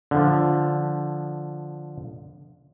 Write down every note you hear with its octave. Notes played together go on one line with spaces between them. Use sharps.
D3 F3